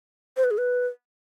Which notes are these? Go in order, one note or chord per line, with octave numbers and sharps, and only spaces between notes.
C5
B4
G#4
B4